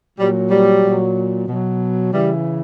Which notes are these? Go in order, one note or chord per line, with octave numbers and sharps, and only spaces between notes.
A#2 F#3 G3
G3
A#2 F#3
B2 F#3
C#3 E3 G3